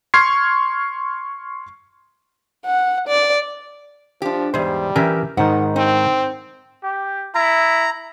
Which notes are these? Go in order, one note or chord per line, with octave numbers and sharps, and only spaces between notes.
C6 C#6 F6 G#6 C7
F#5
D5
F3 D4 G4
E2 G#2 G3 C5
E3 C#4 G4 A#4 E5
G#2 D#3 D#4 F#5
C4 D#4
G4
E4 A#5